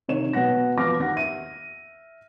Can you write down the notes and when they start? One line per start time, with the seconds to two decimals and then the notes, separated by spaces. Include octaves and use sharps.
0.08 C3 D#3 C#5 E7
0.33 B2 F#3 B3 F#5 A#6
0.78 F3 B3 D6 F6 A#6
0.99 D#2 F#5 A#6
1.16 E5 D#7